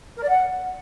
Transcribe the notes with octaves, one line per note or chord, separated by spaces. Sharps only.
A#4
D5
F#5